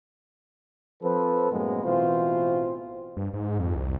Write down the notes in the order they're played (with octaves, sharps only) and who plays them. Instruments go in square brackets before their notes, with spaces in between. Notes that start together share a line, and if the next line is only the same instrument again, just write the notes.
[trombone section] F3 C4 A4 B4
F#2 A2 G#3 A#3 B3
A1 B2 E3 C4 F4 C5
[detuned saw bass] G2
G#2
F2
C2